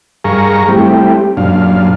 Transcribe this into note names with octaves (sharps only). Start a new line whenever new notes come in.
G2 G#4 A#4 F5 A#5 C#6
G3 A3 C4 E4 G4
F#2 A#2 D4 F5